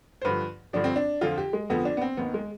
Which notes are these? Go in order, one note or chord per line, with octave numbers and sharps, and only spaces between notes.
C5
G2 D3 F3 B4
G2 D3 F3 D4
C4
D4
F2 D3 F3 F4
G4
G#3
F2 D3 F3 B3
D4
B3
C4
D#2 D#3 B3
G#3